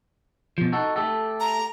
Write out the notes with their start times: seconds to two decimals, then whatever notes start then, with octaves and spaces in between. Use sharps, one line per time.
0.58 B2 F3
0.73 D#4 F#4 A4
0.96 A3 G4 A4
1.40 A#5